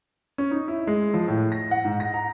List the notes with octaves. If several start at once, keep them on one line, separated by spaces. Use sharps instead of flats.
C#4
D#4
E4
G#3
F3
A2
A#6
F#5
G#2
A#6
A#5